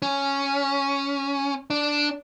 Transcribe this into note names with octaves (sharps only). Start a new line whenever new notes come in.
C#4
D4